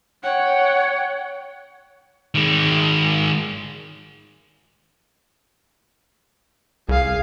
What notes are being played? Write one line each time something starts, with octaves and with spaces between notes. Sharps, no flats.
C#5 F#5 G5
D#3 G#3
C2 G#4 F5